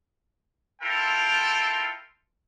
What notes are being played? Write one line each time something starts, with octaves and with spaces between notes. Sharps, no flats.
E4 F4 A4 A#4 G5 C6